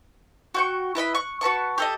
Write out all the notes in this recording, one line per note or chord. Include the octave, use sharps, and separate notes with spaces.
F#4 G5 C#6
E4 B4 D#5 B5
C#6 F#6
F#4 B4 A5 C#6
G4 A4 D#5